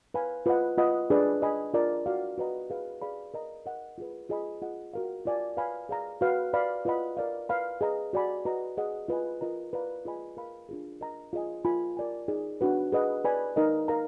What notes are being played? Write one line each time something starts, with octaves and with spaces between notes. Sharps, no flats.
B4 F5 G#5 B5
F4 B4 D#5 F#5
F4 B4 D#5 F#5 B5
D4 G#4 B4 D5
G#4 D#5 G#5 B5
D4 F4 A#4 D5
F#4 D5 F5
F#4 B4 D#5 A#5
G#4 B4 F5
G#4 D5 F5 B5
A#4 D#5 A#5
A#4 D#5 F#5
F4 G#4 B4
F4 G#4 D#5 G#5 B5
F4 G#4 D#5 F#5
F#4 A#4 F5
F4 A#4 D5 F5 G#5
B4 F5 G#5 B5
G#4 D5 F5 A#5
F#4 B4 F5
B4 D5 F5 B5
F4 B4 D#5 F#5 B5
A#4 D5 F5
B4 F5 B5
G#4 B4 D#5 A#5
F#4 D5 G#5 B5
F#4 B4 D#5 A#5
G#4 D#5 F#5
F4 B4 D#5 G#5
F4 A#4 D#5 A#5
B4 D5 F5 A#5
F4 G#4 D#5 G#5 B5
A#4 F5 B5
D4 F4 G#4
A#4 D#5 A#5
F4 G#4 D#5 G#5
F4 A#4 F5 G#5 B5
A#4 D5 G#5
D#4 G#4 D5
D4 F#4 B4
G#4 B4 D#5 F#5
B4 D5 G#5 B5
D#4 A#4 D#5
A#4 F5 A#5